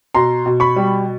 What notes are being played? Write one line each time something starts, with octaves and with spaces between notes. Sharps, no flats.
B2 A#5 C6
B2
B5 C#6
G3